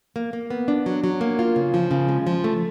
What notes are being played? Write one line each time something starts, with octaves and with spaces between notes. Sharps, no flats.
A#3
A#3
B3
D4
F#3
F#3
A#3
F4
C#3
F3
C#3
G#3
F3
A3